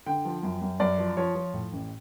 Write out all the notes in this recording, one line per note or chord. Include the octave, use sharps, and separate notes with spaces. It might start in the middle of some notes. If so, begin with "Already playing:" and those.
D3 G5
F3
F#2
F#2
F#2 D5
F3
F3 C#5
F3
A2
A1